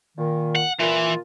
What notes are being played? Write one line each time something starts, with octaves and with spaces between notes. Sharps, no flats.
A#2 D#3
F#5
A#2 E3 F4